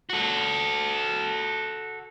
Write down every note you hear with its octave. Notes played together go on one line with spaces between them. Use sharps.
F#4 A4